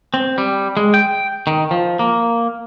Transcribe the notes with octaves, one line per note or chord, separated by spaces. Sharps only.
C4
G3
G#3
G5
D#3
F3
A#3